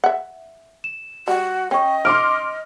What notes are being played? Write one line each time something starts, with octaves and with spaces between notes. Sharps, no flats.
E5 F#5
E7
G3 F#4
C#4 D#5 G5 C#6
C6 D6 F6 D7